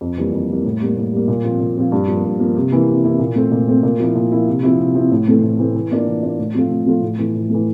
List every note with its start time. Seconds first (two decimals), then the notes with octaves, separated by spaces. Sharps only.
0.01 F2
0.17 E3 G3 A#3
0.32 F2
0.49 E3 G3 A#3
0.65 A2
0.81 G3 A#3
0.97 A2
1.13 G3 A#3
1.28 A#2
1.44 F3 C4 F4
1.60 A#2
1.77 F3 C4 F4
1.92 G2
2.08 F3 A#3
2.24 G2
2.40 F3 A#3
2.56 C3
2.71 E3 A#3 E4
2.88 C3
3.03 E3 A#3 E4
3.19 A#2
3.36 A3 C4
3.52 A#2
3.67 A3 C4
3.83 A#2
3.99 F3 A#3 E4
4.15 A#2
4.32 F3 A#3 E4
4.47 C3
4.63 F3 C4 E4
4.79 C3
4.95 F3 C4 E4
5.11 A2
5.27 E3 A3 C4
5.42 A2
5.59 E3 A3 C4
5.75 E3
5.91 A#3 D4 F4
6.07 E3
6.22 A#3 D4 F4
6.39 A2
6.54 F3 A3 C4 F4
6.70 A2
6.86 F3 A3 C4 F4
7.02 A2
7.18 E3 A3
7.35 A2
7.49 E3 A3